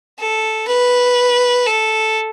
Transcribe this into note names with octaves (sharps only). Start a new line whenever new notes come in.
A4
B4
A4